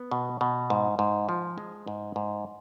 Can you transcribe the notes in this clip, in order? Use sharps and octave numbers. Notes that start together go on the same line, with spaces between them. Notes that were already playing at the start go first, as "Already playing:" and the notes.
Already playing: B3
B2
B2
G#2
G#2
F3
G#3
G#2
G#2